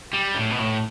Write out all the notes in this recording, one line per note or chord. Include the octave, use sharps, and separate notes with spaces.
G3
A2
B2
A2